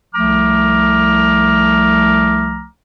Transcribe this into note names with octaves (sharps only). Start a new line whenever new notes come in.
C2 F3 A3 A#5 D6 F6